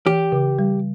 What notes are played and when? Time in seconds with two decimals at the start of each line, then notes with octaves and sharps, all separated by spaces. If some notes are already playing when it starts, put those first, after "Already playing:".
0.06 E3 G4
0.32 C#3
0.59 G3